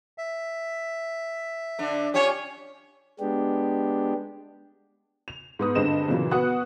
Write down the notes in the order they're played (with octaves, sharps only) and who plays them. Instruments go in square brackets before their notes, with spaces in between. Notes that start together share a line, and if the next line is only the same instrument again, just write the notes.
[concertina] E5
[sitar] D3 D4
[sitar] C#4 F4 G4 [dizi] C#5
[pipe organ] G#3 B3 D4 G4
[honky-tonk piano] F7
G#2 B3 D#6
G2 D3 G#3 C4 D#5 E7
A#2 C#3 E3 F#3 A#3
B3 F#4 F#5 D#6 F#6